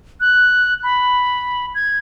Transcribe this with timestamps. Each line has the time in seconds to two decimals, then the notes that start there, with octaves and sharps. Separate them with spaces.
0.21 F#6
0.83 B5
1.75 G#6